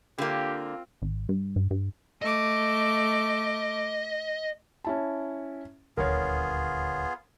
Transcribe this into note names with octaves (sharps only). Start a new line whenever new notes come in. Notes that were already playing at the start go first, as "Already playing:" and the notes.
D3 A#3 C4 F4 G4
G#1
G2
G2
G2
A3 D#5 D6
C#4 E4 A5
D#1 D2 D3 B3 F4 G#4 A#4 C#5